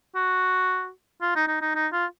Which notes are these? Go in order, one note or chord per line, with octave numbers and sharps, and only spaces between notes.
F#4
F4
D#4
D#4
D#4
D#4
F4